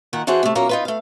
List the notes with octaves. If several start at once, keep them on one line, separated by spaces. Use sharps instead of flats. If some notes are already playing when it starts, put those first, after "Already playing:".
A#2 D#3 A#4 F#5
E3 D4 F#4 G#4 C5
C3 A3
A#2 F#3 A#3 C#4 A#5
D#4 F4 B4
A3 F5